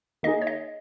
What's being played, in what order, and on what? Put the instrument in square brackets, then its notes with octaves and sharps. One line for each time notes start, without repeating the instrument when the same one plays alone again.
[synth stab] D#3 A#3 D#4 G#4 [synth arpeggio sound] D#5
[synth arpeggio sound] C#5
D#5